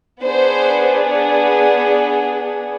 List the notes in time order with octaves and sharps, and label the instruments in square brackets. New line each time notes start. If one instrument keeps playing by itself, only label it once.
[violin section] B3 D4 G#4 C5